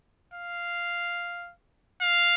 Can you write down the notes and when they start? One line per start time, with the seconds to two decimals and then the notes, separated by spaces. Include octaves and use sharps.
0.33 F5
2.01 F5